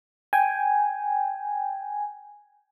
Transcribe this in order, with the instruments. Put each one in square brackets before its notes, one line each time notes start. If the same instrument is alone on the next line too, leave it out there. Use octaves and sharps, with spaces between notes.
[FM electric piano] G5 G#5